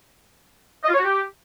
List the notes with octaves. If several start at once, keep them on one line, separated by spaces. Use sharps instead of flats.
D#5
F4
C#5
F#4
G4